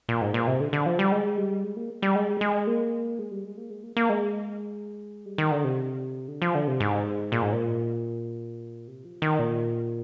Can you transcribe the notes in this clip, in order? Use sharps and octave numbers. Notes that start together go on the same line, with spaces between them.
A#2
G#2
A#2
C3
D3
D3
F3
G3
G#3
G3
G#3
A#3
G3
G#3
G#3
A#3
G#3
G3
G#3
A#3
G#3
A#3
A#3
G#3
G3
D#3
D3
C3
D3
F3
D3
C3
G#2
A#2
G#2
A#2
C3
F3
D#3
A#2